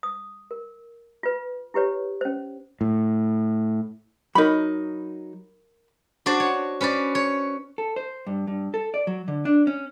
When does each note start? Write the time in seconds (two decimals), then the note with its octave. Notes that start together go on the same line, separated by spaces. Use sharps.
0.03 D#6
0.51 A#4
1.23 F4 B4
1.74 E4 G4 B4 C#5
2.21 C#4 C5
2.81 A2
4.35 F#3 D#4 A#4 B5
6.26 D4 F#4 C5 D5
6.40 C#5
6.81 C#4 B4 C5 D5
7.15 C#5
7.78 A4
7.96 C5
8.27 G2
8.47 G2
8.74 A4
8.94 D5
9.07 F#3
9.28 D3
9.45 D4
9.67 C#4